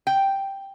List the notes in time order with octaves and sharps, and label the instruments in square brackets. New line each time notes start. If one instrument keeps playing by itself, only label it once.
[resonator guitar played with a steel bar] G5